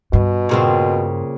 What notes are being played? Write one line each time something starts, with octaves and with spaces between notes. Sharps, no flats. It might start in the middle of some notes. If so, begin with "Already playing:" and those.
G2 B2
A#2 C#3 C4